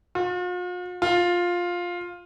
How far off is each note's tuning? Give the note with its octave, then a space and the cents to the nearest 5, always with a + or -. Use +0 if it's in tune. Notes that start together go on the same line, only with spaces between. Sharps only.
F4 +45
F4 +10